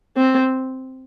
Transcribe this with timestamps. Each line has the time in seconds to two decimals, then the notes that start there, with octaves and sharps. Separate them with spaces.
0.17 C4